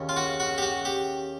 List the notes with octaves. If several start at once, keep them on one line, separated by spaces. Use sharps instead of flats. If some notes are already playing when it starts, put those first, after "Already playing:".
Already playing: D#2 C#3
F4
F#4
F#4
G4
F#4
G4